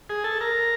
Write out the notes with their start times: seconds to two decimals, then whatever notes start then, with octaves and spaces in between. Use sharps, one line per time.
0.10 G#4
0.24 A4
0.41 A#4